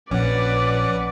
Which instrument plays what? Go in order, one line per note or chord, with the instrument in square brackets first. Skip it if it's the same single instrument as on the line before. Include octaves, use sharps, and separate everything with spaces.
[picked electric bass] A#1 [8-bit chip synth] C#4 F#5 [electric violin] B4 D5